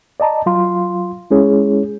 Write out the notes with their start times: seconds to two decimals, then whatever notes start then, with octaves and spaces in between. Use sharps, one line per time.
0.20 D5 D#5 A5 A#5
0.46 F#3 F4 F5 C6
1.31 G#3 C#4 E4 G#4 C#5